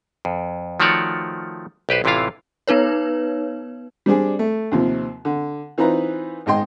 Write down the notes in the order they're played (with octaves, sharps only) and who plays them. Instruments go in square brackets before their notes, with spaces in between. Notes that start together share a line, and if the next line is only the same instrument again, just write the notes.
[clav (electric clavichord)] F2
D#3 F3 A3 F#4 C#5 D5
B1 G4 B4 C5
A1 C3 E3 E4 F4 F5
[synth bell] B3 D#4 B4 C#5
[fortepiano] G3 C4 D4 G#4
A3
D#2 C3 F3
D3
E3 C4 D#4 F4 B4 A#5
G#1 G#2 D#5 G5 C6